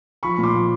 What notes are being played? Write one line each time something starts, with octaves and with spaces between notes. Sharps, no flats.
F3 B5 C#6
A#2
C6 D6
F3